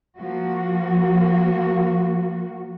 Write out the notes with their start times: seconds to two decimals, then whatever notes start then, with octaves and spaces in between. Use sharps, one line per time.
0.18 F3 A#3 F#4